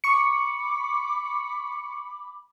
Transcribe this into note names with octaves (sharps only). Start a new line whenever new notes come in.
B5 C#6 D6 C#7